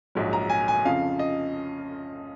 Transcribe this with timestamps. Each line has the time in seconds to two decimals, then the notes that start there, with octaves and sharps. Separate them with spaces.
0.15 A#1 G#2 F#3
0.33 A#5
0.50 G#5
0.68 G#5
0.85 F2 C#3 F3 F5
1.19 D#5